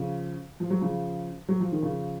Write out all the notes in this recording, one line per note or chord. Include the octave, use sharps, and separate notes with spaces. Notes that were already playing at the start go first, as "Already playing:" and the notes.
Already playing: C#3 F3
F3
F#3
C#3 F3
F#3
F3
D#3
C#3 F3